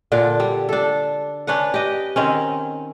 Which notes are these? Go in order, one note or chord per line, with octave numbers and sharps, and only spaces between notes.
A#2 D3 D4
G3
D4 A4
C#4 D4 B4 F#5
G4 D#5
D#3 C4 C#4